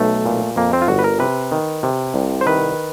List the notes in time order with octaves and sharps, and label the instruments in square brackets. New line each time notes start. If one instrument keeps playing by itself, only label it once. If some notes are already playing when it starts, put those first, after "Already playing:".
Already playing: [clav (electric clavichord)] B1 A3
A#2
F2 A#3
C4
F4
G1 F#4
B4
A#4
C3 B4
D#3
C3
C2
C5
D#3 B4